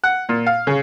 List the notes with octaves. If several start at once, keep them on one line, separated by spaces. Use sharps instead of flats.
F#5
A#2
F5
C#3